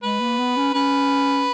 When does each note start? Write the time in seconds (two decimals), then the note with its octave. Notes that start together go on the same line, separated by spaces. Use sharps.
0.02 G#3 B4
0.20 A#3
0.39 B3
0.56 C#4
0.74 C#4 B4